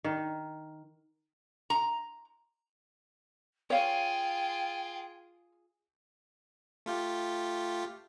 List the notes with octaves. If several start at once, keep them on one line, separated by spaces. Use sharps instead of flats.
D#3
A#5
F4 G#4 C#5 F5 G5
A3 F4 G4